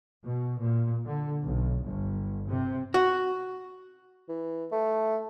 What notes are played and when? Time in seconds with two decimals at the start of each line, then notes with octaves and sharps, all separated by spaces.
0.24 B2
0.59 A#2
1.05 D3
1.42 B1
1.84 G1
2.48 C3
2.94 F#4
4.29 E3
4.72 A3